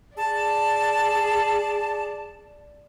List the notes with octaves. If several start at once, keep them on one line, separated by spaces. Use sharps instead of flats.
G#4 D5 A5